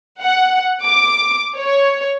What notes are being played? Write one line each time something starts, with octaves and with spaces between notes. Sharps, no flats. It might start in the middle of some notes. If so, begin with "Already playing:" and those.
F#5
D6
C#5